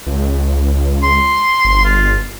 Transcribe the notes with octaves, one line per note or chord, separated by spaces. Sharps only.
C#2
C6
G1
F4